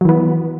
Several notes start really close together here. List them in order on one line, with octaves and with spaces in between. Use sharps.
F#3 E3 B3